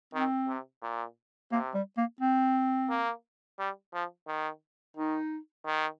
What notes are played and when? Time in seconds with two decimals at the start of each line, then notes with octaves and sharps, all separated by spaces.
0.14 D#3 C4
0.48 C3
0.82 A#2
1.52 C3 A#3
1.74 G3
1.97 A#3
2.21 C4
2.90 A#3
3.59 G3
3.93 F3
4.28 D#3
4.96 D#3 D#4
5.66 D#3